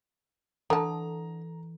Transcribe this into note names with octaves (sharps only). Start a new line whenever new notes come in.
D3 E3 A4 A5 A#5